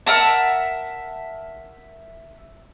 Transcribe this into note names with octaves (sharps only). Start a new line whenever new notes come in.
A#4 E5 F#5 A5